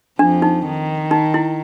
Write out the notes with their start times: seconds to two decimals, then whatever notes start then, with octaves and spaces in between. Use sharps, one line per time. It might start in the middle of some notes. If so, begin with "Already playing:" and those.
0.19 F2 F3 D4
0.42 D#4
0.66 D#3
1.11 D#4
1.34 E4